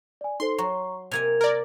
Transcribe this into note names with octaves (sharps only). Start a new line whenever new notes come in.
D5 G#5
D#4 A4 C5 C6
F#3 A#5 C#6
C3 A#3 G#5 G#6 F7
A#4 D5